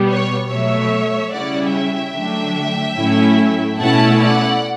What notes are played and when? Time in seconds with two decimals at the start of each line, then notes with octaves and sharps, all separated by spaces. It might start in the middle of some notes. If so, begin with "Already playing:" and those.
Already playing: B2 G3 B3
0.09 C#5
0.50 B2 F#3 A3 C#5 E5
1.32 C#3 G3 C#4 E4 D5 F#5
1.73 E5 G5
2.14 D3 F#3 A3 D4
2.96 A2 F#3 A3 C#4 E4
3.79 B2 A3 C#4 E4 F#5 A5
4.20 D5 F#5